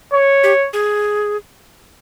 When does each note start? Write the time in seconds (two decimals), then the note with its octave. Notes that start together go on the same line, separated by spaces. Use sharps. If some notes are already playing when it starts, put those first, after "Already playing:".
0.13 C#5
0.43 G4
0.73 G#4